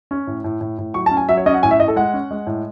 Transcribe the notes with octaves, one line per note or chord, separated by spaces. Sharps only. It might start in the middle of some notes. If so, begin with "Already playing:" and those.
C#4
A2
A2
A2
A2
F#3 C#6
A5
C#4
G#5
F#3 E5
C#5
C#4 D#5
F#5
A2 G#5
E5
A2 D#5
A4
G#3 F#5
C#4
G#3
A2